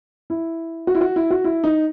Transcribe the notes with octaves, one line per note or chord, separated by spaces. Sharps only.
E4
F#4
E4
F#4
E4
F#4
E4
D#4